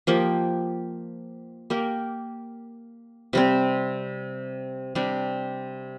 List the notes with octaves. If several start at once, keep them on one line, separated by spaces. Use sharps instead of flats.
F3 A#3 G4
A#3 G4 A#4
C3 G3 C4
C3 G3 D4 G4